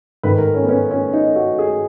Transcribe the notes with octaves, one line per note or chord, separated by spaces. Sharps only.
G#2 D#3 B4
A#4
C#4
B3
C#4
C#4
D#4
F#4
G#4